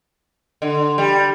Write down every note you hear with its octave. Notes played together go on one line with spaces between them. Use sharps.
D3
G3